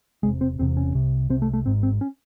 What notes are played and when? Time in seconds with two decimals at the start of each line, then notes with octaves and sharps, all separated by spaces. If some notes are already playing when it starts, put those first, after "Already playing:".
0.23 E1 E2 C3 G#3
0.41 C4
0.58 E1 E2 C3 C4
0.77 C#4
0.94 C2 C3
1.29 C2 C3 C4
1.42 A3
1.53 A3
1.65 G#1 G#2 C4
1.83 C4
2.01 C#4